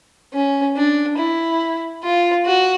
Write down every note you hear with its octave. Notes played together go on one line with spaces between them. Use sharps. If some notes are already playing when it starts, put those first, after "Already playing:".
C#4
D4
E4
F4
F#4